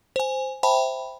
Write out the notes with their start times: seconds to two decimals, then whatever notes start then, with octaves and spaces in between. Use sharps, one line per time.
0.16 C5 G#5
0.63 C5 E5 G5 A5 B5